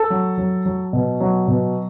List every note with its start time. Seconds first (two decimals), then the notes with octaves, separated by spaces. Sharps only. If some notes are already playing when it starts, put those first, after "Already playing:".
Already playing: A4
0.10 F#3
0.38 F#3
0.66 F#3
0.93 B2
1.20 F#3
1.48 B2